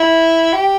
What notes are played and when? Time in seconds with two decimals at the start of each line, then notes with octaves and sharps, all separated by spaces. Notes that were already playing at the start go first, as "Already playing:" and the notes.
Already playing: E4
0.53 G4